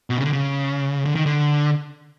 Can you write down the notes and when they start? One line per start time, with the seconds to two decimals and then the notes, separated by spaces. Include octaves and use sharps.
0.10 B2
0.17 C#3
0.25 D3
0.33 C#3
1.05 D3
1.15 D#3
1.26 D3